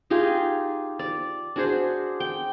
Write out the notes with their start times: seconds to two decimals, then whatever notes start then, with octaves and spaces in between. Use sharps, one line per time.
0.10 D#4 F4 G4 G#4
0.99 D5
1.56 D4 F#4 G#4 C5
2.20 G5